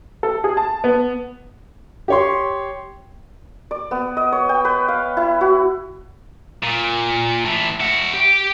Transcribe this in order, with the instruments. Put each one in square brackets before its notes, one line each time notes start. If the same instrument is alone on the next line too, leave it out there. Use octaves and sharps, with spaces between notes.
[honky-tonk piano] A4
G#4
A5
B3
[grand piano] G4 C#5 C6
[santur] D5
B3
D#5
C#5
G5
B4
F5
E4
F#4
[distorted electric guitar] A#2
A2 E3
E4 F#4
G4 G5